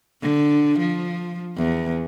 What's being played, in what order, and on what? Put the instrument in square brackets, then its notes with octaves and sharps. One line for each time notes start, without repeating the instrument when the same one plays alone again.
[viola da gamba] D3
F3
E2